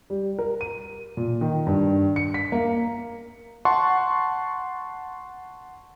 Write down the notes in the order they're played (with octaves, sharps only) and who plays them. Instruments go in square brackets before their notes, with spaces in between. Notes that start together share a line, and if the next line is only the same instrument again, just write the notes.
[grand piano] G3
A#4
D#7
A#2
D#3
G2
C#7
B6
A#3
[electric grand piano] F#5 A5 C6 C#6